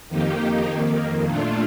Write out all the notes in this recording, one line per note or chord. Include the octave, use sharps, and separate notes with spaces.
F2 D#3 A#3 D#4 G4
F2 D#3 A#3
A#2 A3 D4 F4